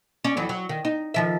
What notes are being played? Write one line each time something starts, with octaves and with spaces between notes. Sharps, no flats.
C#4 D5
F2 E3 F#3
F#3
D#3
D#4
D#3 F3 E5